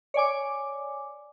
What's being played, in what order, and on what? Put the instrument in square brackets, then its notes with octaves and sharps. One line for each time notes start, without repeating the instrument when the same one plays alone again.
[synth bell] C#5 D5 G#5 D6